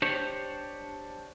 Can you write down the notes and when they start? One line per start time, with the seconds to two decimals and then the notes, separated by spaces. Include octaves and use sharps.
0.02 D4 G4 C5 C#5